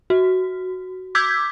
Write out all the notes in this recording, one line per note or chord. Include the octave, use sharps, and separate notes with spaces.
F#4
D6 E6 G6 G#6 B6